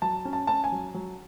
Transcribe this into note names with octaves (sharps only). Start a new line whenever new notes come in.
F#3 A5
C#4
A5
C#4 A5
G#5
F#3
F#3